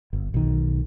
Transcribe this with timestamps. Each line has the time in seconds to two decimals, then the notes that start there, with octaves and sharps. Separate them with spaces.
0.13 G1
0.34 B1 D#3